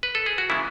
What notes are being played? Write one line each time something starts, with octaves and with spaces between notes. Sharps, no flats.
B4
A4
G#4
F#4
C#3 E3 G#3 B3 E4